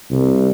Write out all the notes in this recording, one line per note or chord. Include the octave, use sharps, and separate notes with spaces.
C2